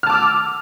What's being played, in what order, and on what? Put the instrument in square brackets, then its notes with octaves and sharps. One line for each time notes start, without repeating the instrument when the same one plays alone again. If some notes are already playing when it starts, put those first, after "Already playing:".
[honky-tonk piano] F6
A5
D6
E6